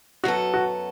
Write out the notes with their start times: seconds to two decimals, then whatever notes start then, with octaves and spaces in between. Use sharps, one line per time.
0.24 F#2 F#3 B3 F#4 A4
0.54 F#4